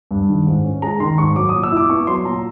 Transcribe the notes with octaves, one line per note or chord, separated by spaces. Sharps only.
G2
D#3
G#2
C#4
G#3 A#5
D#3 C6
G#2 C#6
F#3 D6
A#2 D#6
E6
E4 D6
B3 C#6
F#3 C6
A#2 A#5